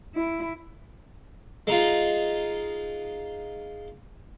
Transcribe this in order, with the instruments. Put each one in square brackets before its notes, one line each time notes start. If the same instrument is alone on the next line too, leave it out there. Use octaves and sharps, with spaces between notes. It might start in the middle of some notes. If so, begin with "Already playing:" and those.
[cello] E4
[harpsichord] G#3 D#4 F4